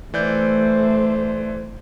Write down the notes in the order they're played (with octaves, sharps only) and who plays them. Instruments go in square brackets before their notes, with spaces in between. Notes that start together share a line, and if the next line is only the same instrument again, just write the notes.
[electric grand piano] E3 D5 G6 [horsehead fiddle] A3 C5